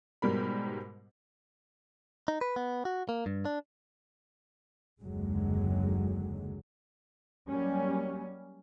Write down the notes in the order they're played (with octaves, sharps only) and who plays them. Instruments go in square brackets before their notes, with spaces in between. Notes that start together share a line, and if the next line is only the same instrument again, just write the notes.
[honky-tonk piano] G#2 B2 G3 A#4 B5
[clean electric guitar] D#4
B4
B3
F#4
A#3
G2
D4
[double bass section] F#1 D#2 D3 F#3 G#3
F#3 G3 A#3 C#4